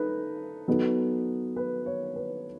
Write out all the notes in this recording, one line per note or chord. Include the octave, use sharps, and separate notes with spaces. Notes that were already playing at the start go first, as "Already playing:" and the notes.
Already playing: D#4 A4 B4
F#3 B3 D#4 A4
B4
C#5
B4